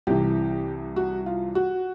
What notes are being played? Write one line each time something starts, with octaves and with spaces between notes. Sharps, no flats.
C2 C3 E3 G4
F#4
F4
F#4